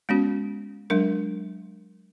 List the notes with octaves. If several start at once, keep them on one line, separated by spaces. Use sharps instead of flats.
G#3 B3 C#4 F#4
F#3 G#3 D4 A#4